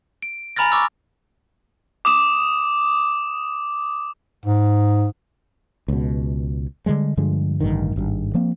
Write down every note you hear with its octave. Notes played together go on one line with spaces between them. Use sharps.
D7
G#5 A#5 B5 F6 A6 A#6
C#6 D6 E6
D6 D#6 E7
G#2
C#2 B2
D3 D#3 G3 G#3
G2 D3 F3 G#3
A1 G2 D3 D#3
G#1 G2
F3 A#3 C4